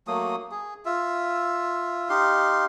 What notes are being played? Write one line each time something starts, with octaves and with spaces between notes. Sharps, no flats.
F#3 A3 A#3 D#6
G#4
F4 E5
D#4 G4 F5 C6